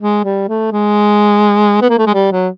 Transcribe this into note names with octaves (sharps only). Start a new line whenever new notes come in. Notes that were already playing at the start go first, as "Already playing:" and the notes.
G#3
G3
A3
G#3
B3
A#3
A3
G#3
G3
F#3